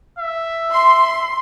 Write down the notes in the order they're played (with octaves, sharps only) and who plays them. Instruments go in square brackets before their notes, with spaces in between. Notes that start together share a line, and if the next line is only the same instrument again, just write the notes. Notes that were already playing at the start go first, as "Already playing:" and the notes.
[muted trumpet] E5
[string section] C6